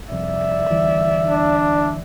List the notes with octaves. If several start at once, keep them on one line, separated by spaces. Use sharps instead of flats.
C2 F2 D5 E5
D2 E3 G3
D4